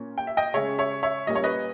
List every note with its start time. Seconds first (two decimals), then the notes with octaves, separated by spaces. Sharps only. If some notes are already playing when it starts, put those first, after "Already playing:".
Already playing: A#2 A#3 C#4
0.18 G5
0.27 E5
0.37 D#5 G5
0.54 C#3 G#3 C#4 C#5 E5
0.78 C#5 E5
1.03 C#5 E5
1.27 A#2 G3 A#3 C#4 D#5
1.35 C#5
1.44 B4 D#5